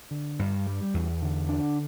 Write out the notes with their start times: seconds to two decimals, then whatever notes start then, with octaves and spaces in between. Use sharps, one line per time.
0.11 D3
0.39 G2
0.67 G3
0.94 E2
1.22 D3
1.49 D4